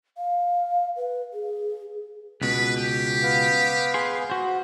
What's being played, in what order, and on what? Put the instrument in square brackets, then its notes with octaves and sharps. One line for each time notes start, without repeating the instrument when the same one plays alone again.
[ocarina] F5
B4
G#4
[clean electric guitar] C#2 B2 [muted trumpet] B4
[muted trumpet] G4
[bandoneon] B3 B4 F5
[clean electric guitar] G#4 C6
F#4 C5